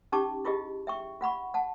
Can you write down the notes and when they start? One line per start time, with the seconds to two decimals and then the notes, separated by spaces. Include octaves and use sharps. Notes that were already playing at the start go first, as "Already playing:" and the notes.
0.12 C#4 D#4 G4 A5 C#6 D6
0.45 E4 F4 G4 G#4 D#5
0.87 E5 G5 C#6
1.21 F4 F#5 B5 C#6
1.54 F#5 A5